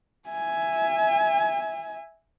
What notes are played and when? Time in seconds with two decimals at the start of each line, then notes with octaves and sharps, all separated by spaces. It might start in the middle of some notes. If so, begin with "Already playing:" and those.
0.28 E5 G#5